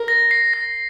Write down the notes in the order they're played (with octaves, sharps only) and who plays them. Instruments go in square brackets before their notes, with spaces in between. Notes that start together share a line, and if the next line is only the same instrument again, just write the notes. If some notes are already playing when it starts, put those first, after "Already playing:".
Already playing: [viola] A#4
[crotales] A#6
C7
A#6